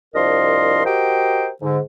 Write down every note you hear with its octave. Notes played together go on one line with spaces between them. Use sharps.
C2 F3 D4 A#4 D#5 C6
F#4 G4 A#4 C5 D#5 G5
G#2 D3